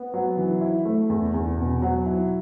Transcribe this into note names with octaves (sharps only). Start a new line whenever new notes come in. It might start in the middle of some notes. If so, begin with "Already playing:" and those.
Already playing: B3
F#3
E3
E4
A3
E2
E2
B2
F#3
E4